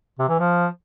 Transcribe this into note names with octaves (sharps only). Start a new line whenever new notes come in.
C3
E3
F3